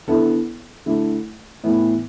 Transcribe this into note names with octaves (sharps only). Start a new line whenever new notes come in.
D3 B3 E4 A4
D3 A3 E4
A2 E3 B3